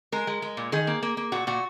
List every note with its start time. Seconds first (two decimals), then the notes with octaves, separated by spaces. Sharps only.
0.12 G#3 A#4
0.27 G#3
0.42 G#3
0.57 A#2
0.72 D#3 G#4
0.87 A#3
1.03 A#3
1.17 A#3
1.32 A#2 F#4
1.47 A#2 F#4